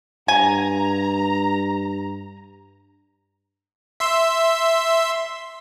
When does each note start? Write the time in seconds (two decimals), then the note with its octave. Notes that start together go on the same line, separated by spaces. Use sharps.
0.28 G2 G#5 A#5
4.00 E5 C6 E6